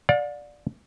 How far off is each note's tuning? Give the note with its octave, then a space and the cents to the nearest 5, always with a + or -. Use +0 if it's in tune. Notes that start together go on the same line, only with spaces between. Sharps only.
D5 +0 F5 +45